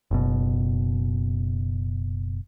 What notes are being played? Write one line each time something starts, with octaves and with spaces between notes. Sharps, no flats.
F#1 B2